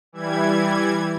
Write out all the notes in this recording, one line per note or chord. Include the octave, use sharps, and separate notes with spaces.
E3 G3 E4 G#6